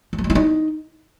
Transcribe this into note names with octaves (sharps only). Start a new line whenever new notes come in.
A3
F#3
G#3
E4
D#4